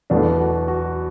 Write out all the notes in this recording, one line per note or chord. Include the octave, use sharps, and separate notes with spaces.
E2 B2 F#3 A3 D4
F#4
F#4